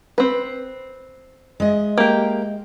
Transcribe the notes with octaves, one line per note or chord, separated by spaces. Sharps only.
C4 B4
G#3 D#5 E5
A#3 G4